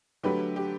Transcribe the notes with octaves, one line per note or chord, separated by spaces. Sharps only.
D3 F#3 A3 G4 B4
G4